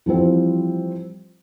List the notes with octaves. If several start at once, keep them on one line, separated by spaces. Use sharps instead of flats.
E3 F3 G3 C4